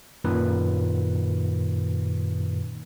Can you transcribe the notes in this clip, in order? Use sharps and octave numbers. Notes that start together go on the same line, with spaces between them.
F#2 A#2 D#3 B4